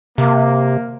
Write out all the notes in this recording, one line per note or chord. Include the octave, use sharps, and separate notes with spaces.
C3 A#3